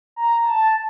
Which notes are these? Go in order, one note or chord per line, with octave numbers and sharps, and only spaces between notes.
A#5
A5